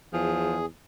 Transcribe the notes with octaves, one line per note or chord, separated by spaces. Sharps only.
E2 F3 G#4